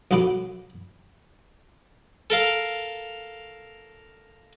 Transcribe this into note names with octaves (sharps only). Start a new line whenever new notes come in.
B1 F#2 F#4 A4 B4 D6
A4 A#4 F5